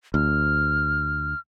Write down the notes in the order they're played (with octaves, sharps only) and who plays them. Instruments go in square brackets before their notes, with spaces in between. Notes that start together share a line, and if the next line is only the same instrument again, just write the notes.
[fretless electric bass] D2 [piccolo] F6